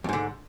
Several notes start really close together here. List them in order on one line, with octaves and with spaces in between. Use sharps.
F2 G#2 D3